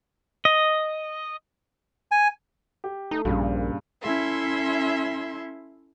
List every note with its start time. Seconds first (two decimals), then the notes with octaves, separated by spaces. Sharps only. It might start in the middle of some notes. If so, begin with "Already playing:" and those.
0.45 D#5
2.12 G#5
2.84 G4
3.11 A3 D#4
3.25 A#1 G2 A#2 C#3
4.02 C#4 E4 A4 E5 C6